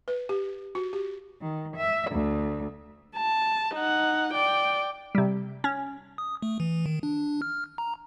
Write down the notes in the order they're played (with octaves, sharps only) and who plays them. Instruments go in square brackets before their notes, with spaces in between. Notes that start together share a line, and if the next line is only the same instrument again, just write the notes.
[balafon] B4
G4
F#4
G4
[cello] D#3
E5
D2
[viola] A5
D#4 F#5
D5 G5
[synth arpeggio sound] C3 G3
C#4
[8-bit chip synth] D#6
A3
E3
D#3
D4
F6
A#5